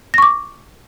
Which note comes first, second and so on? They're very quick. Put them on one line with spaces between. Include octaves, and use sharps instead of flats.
A#6 C#6 D6